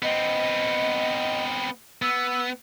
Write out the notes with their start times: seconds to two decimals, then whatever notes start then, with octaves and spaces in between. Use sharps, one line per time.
0.02 B3 C4 D#5
2.02 B3 E6